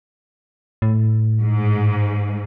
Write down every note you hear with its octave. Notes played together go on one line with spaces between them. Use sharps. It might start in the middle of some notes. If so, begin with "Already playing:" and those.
A2
G#2